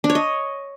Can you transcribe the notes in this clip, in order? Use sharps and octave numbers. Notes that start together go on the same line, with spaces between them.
D4
C#5
D#5